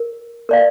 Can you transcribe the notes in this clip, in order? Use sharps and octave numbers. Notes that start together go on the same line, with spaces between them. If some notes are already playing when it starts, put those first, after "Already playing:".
Already playing: A#4
A#4 D5 F5